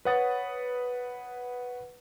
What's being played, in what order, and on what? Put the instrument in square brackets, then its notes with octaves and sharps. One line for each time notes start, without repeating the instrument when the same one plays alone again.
[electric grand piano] B4 C#5 F#5 D#6 A6